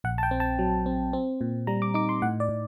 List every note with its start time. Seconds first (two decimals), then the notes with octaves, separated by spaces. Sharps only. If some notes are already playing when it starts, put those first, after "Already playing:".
0.04 A#1 F#5
0.18 A5
0.23 G5
0.31 C4
0.40 A5
0.59 F#3
0.86 C4
1.13 C4
1.41 A#2
1.67 G3 A#5
1.82 D6
1.94 D#4 D6
2.09 C6
2.22 A2 F#5
2.40 D5
2.49 A2